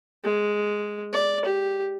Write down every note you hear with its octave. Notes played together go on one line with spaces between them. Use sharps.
G#3
D5
G4